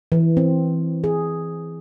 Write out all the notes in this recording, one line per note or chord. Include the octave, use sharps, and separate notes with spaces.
E3
C4
G#4